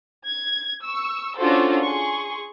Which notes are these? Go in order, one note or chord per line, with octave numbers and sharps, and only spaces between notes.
G#6
C#6 E6
C#4 D4 F4 F#4 A4 C5
G#4 C6 C#6